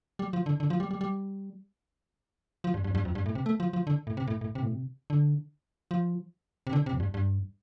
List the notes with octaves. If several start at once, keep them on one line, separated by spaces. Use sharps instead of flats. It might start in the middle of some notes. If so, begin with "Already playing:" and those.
G3
F3
D3
D3
F3
G3
G3
G3
F3
G2
G2
F2
G2
F2
G2
A2
C3
A3
F3
F3
D3
A2
C3
A2
A2
C3
A2
C3
D3
F3
C3
D3
C3
F2
G2
G2